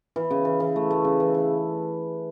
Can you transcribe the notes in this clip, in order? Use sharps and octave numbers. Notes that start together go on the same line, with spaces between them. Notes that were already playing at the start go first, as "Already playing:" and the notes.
E3
C#3
E3
E3
A3
A3
C#3
E3
E3